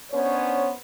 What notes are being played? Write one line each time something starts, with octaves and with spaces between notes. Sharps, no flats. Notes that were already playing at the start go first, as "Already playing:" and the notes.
B3 C#4 D4 C5 C#5